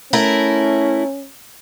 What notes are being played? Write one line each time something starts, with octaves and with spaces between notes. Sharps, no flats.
A3 C#4 E4 A#4